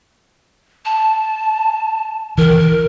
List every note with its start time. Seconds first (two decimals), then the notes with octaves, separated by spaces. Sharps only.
0.85 A5
2.38 E3 A#4